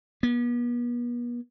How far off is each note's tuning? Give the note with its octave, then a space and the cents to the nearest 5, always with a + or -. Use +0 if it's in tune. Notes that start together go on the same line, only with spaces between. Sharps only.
B3 -40